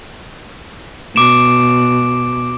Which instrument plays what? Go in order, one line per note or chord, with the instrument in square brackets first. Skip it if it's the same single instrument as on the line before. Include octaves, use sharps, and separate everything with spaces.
[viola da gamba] B2 [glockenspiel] D6 D7 E7